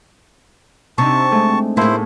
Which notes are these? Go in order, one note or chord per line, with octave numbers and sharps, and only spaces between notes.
C3 C4 D4 D#4 A5 C#6
G#3 A3
A2 A#3 E4 G#4 C5 A5